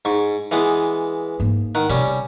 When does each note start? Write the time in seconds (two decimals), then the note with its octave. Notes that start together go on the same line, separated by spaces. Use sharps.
0.05 G#2 C#6
0.51 E3 G#3 B3
1.40 G#2 A#3
1.75 D#3 F#5
1.90 C3 G3 C#4